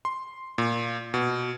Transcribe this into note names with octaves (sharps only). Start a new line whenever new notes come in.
C6
A#2
B2